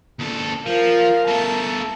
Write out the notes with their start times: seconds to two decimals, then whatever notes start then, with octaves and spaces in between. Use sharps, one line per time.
0.20 D#2 A4
0.66 F3 A#4 F5
1.28 A3 A#4 A5